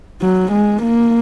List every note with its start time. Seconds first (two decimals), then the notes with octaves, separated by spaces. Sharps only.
0.21 F#3
0.52 G#3
0.82 A#3